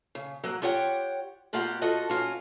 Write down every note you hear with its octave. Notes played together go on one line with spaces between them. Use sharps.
C#3
F#3 A#3 F#5
F4 G4 C#5 F#5 G5
B2 A#3 F4 G4 F#5
F4 F#4 A4 D#5 F#5
C#4 F4 F#4